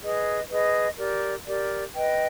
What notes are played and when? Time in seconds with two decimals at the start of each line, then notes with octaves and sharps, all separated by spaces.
0.02 G#4 B4 D#5
0.50 G#4 B4 D#5
0.97 G4 A#4 D5
1.46 G4 A#4 D5
1.94 B4 D#5 G5